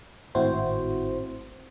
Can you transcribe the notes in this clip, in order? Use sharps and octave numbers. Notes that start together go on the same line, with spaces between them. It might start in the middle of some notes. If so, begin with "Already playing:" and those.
G#1 A2 C4 E4 F#4 C5